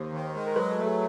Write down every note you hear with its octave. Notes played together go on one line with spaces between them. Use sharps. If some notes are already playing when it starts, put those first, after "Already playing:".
Already playing: D#2 C5
D#3
G#3
A#4
F#3 B4
A4
A3
G#4